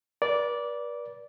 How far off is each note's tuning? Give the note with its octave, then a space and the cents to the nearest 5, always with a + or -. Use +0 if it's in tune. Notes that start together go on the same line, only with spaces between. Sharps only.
B4 -45 D5 -10